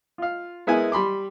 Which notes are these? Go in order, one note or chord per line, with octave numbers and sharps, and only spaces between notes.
F4 F5
G#3 B3 E4 A#4 G#5
G3 B5 C6 D6